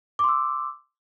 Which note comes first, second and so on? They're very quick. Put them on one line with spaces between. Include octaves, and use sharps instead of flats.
D6 C6 E6